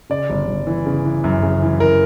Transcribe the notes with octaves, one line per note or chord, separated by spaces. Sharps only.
C#3 D5
G1
G1
E3
C#3
E3
F#2
C#3
E3
E3 A#4